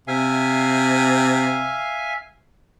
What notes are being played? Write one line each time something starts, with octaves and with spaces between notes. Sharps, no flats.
C3 E5 F5 G#5